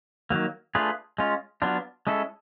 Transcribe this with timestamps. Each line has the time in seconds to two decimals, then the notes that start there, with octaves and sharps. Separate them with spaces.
0.30 D#3 F#3 A#3
0.75 A3 D4 F4 G#4 B4
1.18 G#3 C#4 F4
1.62 F#3 B3 D4 F4
2.07 G#3 C#4 E4 A4